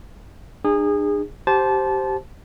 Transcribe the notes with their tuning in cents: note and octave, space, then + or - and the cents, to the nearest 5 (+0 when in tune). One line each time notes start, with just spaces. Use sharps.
D4 +40 G#4 -25
G4 -15 C5 +0 A5 -20